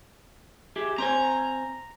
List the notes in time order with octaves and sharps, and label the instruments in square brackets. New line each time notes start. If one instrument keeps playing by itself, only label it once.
[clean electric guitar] G4 G#4 E5
[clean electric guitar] C4 C5 G#5 [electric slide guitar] A#5